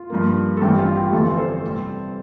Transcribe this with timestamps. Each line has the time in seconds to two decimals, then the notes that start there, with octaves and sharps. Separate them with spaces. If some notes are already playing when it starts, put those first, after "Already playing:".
Already playing: F4
0.10 G2 F3 A#3
0.57 A4
0.61 A1 G2 E3 A3 C4 G4
0.78 F4
0.95 G4
1.12 G1 F2 E3 G3 C4 F4 A4
1.37 A4 C5
1.64 C3 G3 C4